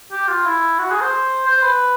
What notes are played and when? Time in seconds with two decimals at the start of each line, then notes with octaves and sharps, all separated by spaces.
0.12 G4
0.28 F4
0.45 E4
0.79 F#4
0.90 G#4
1.01 C5
1.46 C5
1.62 B4